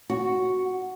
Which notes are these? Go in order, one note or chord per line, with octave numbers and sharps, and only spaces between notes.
F#4